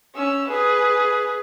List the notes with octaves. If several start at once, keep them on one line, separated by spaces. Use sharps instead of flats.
C#4 E6
G#4 B4